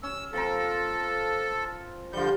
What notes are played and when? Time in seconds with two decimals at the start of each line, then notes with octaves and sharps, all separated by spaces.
0.03 C#4 E6
0.33 F3 C4 A4 A#4
2.13 D3 F3 G3 F4 G6